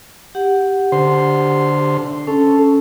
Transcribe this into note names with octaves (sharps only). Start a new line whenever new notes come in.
G4 F#5
D3 C5 C6
C#4 A4